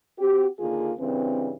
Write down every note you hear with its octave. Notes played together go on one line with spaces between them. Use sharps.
C4 F#4 G4
D#2 D3 A#3 F4 G#4
G2 C#3 E3 C4